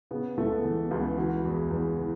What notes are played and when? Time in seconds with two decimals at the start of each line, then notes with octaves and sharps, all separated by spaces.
0.11 C#3 B3
0.37 C#2 A3
0.51 B3
0.64 E3 B3
0.78 B3
0.91 C#2 B3
1.05 E4
1.18 E3 F#4
1.44 E2
1.71 E2
1.98 E3